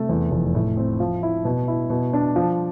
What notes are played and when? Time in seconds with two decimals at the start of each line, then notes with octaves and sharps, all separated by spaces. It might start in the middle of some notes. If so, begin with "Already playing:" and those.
Already playing: C3 A3
0.09 E2
0.31 F1
0.55 A2
0.77 C4
1.00 F3
1.23 E4
1.45 B2
1.68 E4
1.90 B2
2.13 D4
2.36 F3